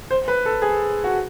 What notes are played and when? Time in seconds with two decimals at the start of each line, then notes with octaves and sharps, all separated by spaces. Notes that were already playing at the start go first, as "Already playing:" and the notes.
0.11 C5
0.28 B4
0.46 A4
0.62 G#4
1.04 F#4